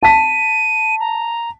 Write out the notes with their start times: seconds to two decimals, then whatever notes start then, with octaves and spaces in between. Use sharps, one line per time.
0.03 A5 B6 D#7
1.00 A#5